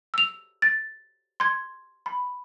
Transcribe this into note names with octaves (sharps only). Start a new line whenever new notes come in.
E6 F7
A6
C6 G#6
B5